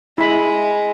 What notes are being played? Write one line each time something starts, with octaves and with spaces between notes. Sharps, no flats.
G#3 E4 B5